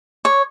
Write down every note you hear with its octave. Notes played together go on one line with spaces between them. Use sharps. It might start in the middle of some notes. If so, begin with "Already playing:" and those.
C#5